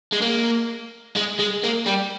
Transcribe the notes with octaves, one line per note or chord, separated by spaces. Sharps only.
G#3
A#3
G#3
G#3
A#3
G3